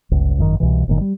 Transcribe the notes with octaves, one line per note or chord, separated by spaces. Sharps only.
G1 C#2
G#1 F#2 B2 D#3
C2 B2 E3
G1 A#2 D#3
G3